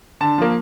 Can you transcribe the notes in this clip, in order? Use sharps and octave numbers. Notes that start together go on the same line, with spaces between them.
D3 A5
F3 A#3